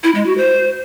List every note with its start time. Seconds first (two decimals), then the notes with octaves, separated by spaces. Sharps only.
0.04 E4
0.15 G#3
0.26 F#4
0.37 C5